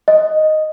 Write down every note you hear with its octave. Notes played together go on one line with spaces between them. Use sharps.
D#5